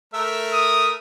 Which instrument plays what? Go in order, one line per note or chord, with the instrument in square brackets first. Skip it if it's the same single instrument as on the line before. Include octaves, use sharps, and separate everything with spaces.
[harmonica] A3 A#4 E5
[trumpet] D#6